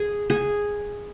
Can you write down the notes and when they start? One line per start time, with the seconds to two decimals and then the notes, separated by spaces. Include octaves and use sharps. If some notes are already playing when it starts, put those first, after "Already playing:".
Already playing: G#4
0.30 G#4